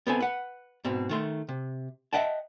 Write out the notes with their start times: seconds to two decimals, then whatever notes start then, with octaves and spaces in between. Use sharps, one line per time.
0.07 B3 C4 A4 G#5
0.20 B4 F#5
0.84 G#2 B2 C4
1.09 D#3 A3 C6
1.49 C3
2.13 D#5 E5 F#5 G5 A5